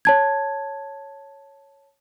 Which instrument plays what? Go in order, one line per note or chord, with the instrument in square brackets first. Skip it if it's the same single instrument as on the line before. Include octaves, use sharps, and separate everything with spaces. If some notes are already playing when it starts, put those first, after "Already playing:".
[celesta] C#5 A5 G#6